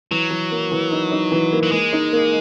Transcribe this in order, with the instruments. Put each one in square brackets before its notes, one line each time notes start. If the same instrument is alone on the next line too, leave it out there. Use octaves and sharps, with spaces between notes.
[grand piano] E3 [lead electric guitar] F#3
[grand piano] E3
A#3
E3
D#4
D#4
E3
A#3
[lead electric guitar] F#3
[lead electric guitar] G#3 [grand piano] A#3
[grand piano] D#4
A#3